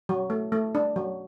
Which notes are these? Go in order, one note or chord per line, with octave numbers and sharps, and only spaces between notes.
F#3
A3
A3
D4
F#3